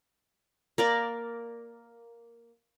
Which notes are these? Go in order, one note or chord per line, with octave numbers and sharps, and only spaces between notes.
A#3 A#4 D5